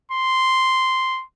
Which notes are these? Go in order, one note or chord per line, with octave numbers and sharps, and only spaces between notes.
C6